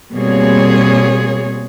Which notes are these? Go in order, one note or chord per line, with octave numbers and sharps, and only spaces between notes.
B2 G3 A#3 C4 G#4 C#5